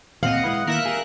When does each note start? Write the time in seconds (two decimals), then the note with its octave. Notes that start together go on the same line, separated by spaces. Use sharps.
0.23 D2 A#2 C4 D#5 F5 F#5
0.44 G#3 E4 B4
0.67 D#3 A#3 E4 A#4 E5 F#6
0.85 G4 G#4